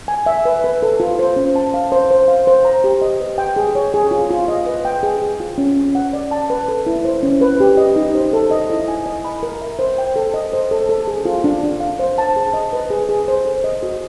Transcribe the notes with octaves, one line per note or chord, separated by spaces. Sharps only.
G#5
E5
B4
B4
A4
F4
C5
C#4
A5
F5
C5
C5
F5
C5
A#5
G4
D#5
B4
G5
G#4
C#5
G#4
F4
F4
D#5
B4
G5
G#4
G#4
F4
C#4
C#4
F#5
D5
A5
B4
A4
E4
C5
C#4
B4
G4
D#5
D#4
C5
A4
D#5
E4
G#5
D#5
B5
A#4
E5
C5
G5
A4
D#5
C5
A4
A4
G#4
F4
D4
D4
F5
C5
A5
G#4
D#5
B4
G#4
G#4
C5
A4
D#5
F#4